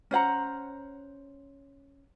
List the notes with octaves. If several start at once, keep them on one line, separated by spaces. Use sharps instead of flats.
C#4 C5 F#5 A#5